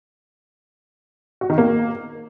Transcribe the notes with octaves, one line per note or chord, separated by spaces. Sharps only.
F#4
D#3
A#3